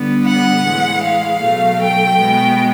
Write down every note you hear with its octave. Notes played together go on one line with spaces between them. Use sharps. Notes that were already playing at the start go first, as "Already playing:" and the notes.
Already playing: D3 G3 B3
F#5
A2 E3 G#3
F5
B2 F#3 A3
G5
B2 G#3 B3